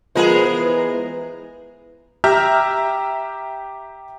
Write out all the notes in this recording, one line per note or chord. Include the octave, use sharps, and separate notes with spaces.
F3 G#3 B3 G#4 A#4 C5
E3
G4 E5 A#5 E6 F6 G6